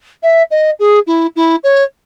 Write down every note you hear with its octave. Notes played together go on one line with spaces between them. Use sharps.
E5
D#5
G#4
E4
E4
C#5